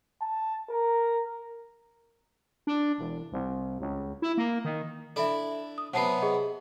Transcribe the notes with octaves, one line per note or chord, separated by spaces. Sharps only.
A5
A#4
D4
E1
C2
C#2
E4
A#3
D#3
D4 E4 A4 E5
D#6
C3 F#3 B3 F#5 A5 C7
G#4 D#5